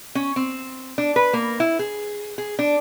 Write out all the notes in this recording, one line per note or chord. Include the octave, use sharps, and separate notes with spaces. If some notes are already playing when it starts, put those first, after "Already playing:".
C#4
C4
D4
B4
A#3
E4
G#4
G#4
D4